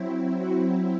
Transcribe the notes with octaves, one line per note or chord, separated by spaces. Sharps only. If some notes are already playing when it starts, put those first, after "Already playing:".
Already playing: F#3 C4 E4
F#4